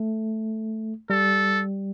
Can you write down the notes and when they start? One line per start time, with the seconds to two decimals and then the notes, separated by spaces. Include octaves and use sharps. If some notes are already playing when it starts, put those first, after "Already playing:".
Already playing: A3
1.10 G3 A4